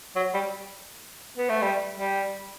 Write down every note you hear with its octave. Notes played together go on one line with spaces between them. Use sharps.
F#3
G3
B3
A3
G3
G3